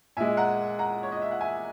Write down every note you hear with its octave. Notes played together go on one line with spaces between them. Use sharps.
A#2 G#3 E5 G#5
F#5 A#5
F#5 A#5
C#5
D#5
E5
F#5
E5 G#5